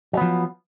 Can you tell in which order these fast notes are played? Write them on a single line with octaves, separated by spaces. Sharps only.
F#3 B3 F3